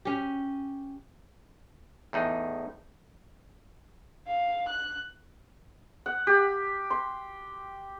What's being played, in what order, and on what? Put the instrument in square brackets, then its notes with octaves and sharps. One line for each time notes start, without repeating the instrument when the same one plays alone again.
[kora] C#4 G4
[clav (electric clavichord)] E2 A2 D#4
[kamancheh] F5
F#6
[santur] F#5
G4
C6